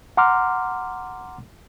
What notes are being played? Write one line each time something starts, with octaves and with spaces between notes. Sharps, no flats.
F#5 A#5 C6 D6 F6